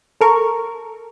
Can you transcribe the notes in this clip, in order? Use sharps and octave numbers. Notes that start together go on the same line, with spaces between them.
A4 A#4 C#6